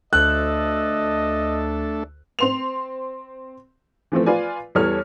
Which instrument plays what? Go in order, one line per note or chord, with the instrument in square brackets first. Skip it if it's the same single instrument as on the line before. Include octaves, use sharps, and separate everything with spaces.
[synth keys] D2 E6 [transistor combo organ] A3 D4 A4 [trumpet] D#5 [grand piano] F#6
[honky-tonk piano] C4 C6 F7
E3 F3 A3 C4
F4 B4 D5 G#5
E2 E3 G3 A4 C#5 F6